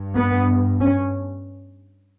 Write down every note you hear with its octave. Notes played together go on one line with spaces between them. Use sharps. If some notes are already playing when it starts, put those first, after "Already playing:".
Already playing: G2
B3
C#4